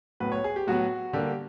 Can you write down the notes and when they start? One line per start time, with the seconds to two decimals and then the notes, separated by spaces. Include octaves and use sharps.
0.20 A2 F#3 B3 B4
0.32 C#5
0.44 G#4
0.56 G4
0.67 A2 F#3 B3 F#4
1.13 D3 G3 A#3 G4